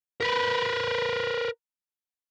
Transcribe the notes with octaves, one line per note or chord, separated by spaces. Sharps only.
A#4 B4